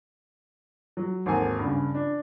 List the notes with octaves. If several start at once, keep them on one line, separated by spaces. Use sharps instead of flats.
F#3
G#1 D#2 A4 A#4 G#5
G2 C#3
D4